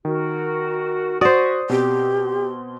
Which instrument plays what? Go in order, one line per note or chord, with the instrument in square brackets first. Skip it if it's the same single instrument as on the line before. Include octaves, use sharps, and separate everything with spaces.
[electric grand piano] D#3 [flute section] F#4 A#4
[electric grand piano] F#4 D#6 [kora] C5 D5 [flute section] E5 C#6
[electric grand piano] B2 C4 [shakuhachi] G4 [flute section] C6